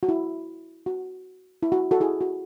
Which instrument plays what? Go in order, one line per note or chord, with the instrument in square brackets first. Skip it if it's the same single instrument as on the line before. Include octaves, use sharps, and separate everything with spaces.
[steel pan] F#4
E4
F#4
E4
F#4
F#4 A4
E4 G#4
F#4